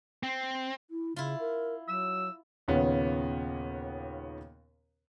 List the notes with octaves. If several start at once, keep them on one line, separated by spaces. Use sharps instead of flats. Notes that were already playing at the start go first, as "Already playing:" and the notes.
C4
E4
C#3 E4 F4
A#4
F#3 E6
D#2 A#2 C#3 B3 C#4